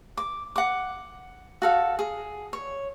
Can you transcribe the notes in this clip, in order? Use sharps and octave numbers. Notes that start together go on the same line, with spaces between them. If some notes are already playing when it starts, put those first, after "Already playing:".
D6
F#5 D6
F#4 A4 F5
G#4
C#5